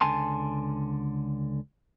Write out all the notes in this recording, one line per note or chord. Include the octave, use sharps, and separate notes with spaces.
C#2 D3 G#5 A5 C6